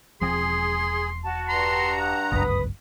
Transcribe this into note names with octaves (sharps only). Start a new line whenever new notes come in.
E1 F3 C4 G#4 C6
F#4 A5
G2 A#5 C6
F#5
G1 C#2 F#2 B4 D#6